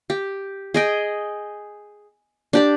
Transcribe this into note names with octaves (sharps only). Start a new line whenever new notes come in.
G4
G#4 D#5 G5
D4 G4 D5